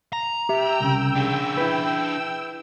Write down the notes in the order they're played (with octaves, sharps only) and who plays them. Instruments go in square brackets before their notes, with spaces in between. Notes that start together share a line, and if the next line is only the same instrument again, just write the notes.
[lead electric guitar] A#5
[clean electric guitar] G4 E5 [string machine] G5 E6
[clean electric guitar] C2 C#3
[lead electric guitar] D4 G#4
[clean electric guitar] E4 B4